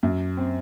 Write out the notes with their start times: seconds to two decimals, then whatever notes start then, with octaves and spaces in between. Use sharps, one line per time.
0.03 F#2
0.37 C4